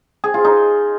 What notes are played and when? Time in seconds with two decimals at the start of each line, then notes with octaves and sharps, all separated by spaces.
0.24 G#4
0.34 F4
0.45 D#4